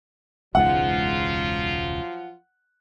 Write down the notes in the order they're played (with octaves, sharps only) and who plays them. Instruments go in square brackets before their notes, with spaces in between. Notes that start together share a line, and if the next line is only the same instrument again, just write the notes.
[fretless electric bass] E1 C#2 G#2 [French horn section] F3 F#3 F4 [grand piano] F#5